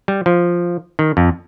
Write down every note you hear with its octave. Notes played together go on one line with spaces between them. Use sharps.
G3
F3
D#3
F2